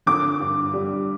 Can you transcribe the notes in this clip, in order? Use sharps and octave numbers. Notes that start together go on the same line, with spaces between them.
D3 D6
G2
G3